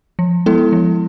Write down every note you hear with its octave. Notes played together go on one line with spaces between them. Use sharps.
F3
G#3 B3 E4 A4
F3